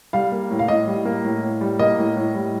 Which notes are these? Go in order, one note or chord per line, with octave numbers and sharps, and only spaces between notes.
G3 F5
A#3
A2
F5
A2 D#5
G3
A#3
A2
A2
G3
A#3 D#5
A2
A2
G3